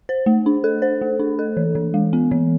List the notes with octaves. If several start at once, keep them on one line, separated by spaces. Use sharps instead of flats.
C5
A3
D4
A4
C5
A3
D4
A4
E3
E3
G#3
B3
E3